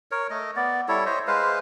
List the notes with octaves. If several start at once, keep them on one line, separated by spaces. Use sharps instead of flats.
A#4 C#5
A3 D#5
B3 D5
G3 E4 A4 C#5
C5 C#5 D#5 E5
G#3 B4 C5 F5